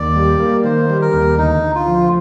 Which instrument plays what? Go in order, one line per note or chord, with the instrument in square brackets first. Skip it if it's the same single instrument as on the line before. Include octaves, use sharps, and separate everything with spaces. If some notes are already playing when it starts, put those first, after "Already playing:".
Already playing: [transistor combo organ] D#2 [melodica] D5
[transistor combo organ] G3
A#3
[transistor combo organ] D#3 [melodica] C5
[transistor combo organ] G3
[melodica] A#4
[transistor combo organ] D#2
[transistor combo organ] D2 [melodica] D#4
[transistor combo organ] D2
[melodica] F4
[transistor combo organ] F3